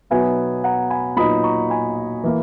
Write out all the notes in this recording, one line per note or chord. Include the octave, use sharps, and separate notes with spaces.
B2 F#3 B3 D#4 E5 G#5
F#5 A#5
G#5 B5
A#2 F#3 B3 D#4 B5 D#6
A#5 C#6
G#5 B5
E3 A#3 E4